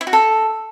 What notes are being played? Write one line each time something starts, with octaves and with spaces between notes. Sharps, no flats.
E4
F#4
A4